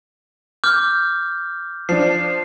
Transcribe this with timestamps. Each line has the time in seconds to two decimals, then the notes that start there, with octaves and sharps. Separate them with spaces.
0.64 D6 F6 G6
1.89 F3 D4 C7